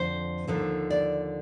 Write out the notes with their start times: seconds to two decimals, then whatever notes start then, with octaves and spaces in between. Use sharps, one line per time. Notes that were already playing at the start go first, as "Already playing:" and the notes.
Already playing: F2 D3 F3 C5
0.47 D#2 D3 F3
0.90 D5